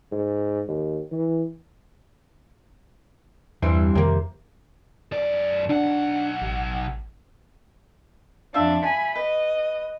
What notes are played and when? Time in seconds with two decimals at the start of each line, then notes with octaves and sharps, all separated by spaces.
0.12 G#2
0.67 D#2
1.11 E3
3.62 E2 G2 E3 C4
3.95 F2 C3 D#3 F3 A#3
5.12 F#2 D5
5.69 B1 D4 F#5
6.42 A1
8.54 F2 D4 F4 E5
8.84 G#5 B5
9.16 B4 D#5